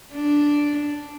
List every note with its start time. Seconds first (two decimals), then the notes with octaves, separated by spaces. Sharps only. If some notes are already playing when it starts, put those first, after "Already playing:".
0.14 D4